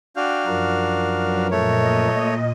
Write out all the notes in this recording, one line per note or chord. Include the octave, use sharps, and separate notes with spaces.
D4 F#4 F5 G5
F#2 F3 A#4
F#3 C#4 B4
A#2 A3 C#5 D#5